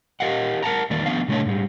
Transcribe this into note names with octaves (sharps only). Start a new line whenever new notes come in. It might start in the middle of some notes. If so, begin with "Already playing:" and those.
G4 A#4 D#5 F5 F#5
A#4 F#5 A5 A#5
E2 D#3 A#3 D5
F3 B3 D4 F5
A#2 C#3 A3 A#3 D4 C#5
G#2 G3